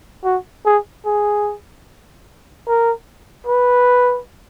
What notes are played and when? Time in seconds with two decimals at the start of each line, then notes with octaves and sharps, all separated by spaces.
0.25 F#4
0.66 G#4
1.06 G#4
2.67 A#4
3.47 B4